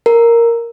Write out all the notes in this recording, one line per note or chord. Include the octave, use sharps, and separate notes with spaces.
A#4